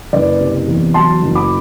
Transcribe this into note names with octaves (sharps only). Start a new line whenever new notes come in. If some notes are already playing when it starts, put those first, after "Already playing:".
F#1 B4 D5
C3
E2
F#3 A5 C6
F#1
B5 D6